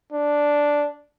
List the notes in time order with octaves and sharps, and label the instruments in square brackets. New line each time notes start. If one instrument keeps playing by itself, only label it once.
[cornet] D4